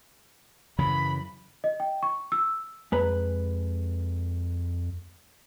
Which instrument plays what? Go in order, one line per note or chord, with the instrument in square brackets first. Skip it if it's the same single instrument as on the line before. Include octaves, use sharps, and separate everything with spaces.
[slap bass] F#2 C#3 E3 [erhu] B5
[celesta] D#5
G5
C#6
E6
[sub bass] F2 [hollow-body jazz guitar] G#3 B4 A#5